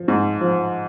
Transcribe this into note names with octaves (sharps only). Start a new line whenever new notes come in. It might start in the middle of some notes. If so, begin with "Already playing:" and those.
Already playing: F3
G#2
F3